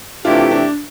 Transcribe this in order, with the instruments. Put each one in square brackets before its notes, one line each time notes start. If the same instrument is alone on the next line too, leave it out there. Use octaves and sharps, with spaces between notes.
[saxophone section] C3 E3 A3 E4 G4 [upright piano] D4 F4
[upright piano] D4